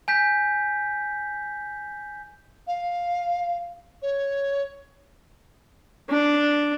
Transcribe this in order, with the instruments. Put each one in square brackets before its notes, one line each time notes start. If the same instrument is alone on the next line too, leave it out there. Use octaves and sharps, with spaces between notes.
[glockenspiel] G#5 G6 B6
[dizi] F5
C#5
[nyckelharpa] D4